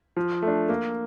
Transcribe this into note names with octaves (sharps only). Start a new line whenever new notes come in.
F3
A3
D4
A#3